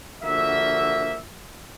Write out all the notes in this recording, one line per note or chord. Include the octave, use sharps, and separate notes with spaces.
A#1 D3 A#3 F#4 E5